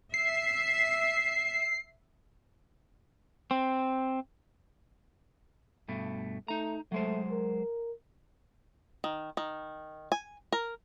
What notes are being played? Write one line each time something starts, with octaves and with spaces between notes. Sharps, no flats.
E5 C7
C4
G2 B2 A3
A3 D#4 A#5
F#3 G#3 A3 C5
A#4
D#3
D#3
G#5
A#4